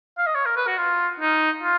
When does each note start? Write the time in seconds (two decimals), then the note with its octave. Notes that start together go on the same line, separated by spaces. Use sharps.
0.18 F5
0.26 D#5
0.35 C#5
0.46 A#4
0.56 B4
0.67 F#4
0.78 F4
1.20 D#4
1.63 F4